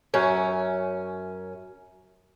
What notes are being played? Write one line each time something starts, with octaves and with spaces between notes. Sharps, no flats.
F#2 C#4